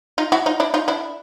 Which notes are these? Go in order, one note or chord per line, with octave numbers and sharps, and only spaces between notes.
D#4 F4
E4 F#4
D#4 F4
D4 E4
D#4 F4
D4 E4